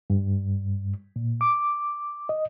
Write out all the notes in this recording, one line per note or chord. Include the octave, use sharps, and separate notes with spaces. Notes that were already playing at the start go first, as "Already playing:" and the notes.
G2
A#2
D6
D#5